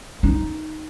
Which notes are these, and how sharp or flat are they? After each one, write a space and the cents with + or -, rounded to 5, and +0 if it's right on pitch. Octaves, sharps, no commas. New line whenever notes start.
D#4 +0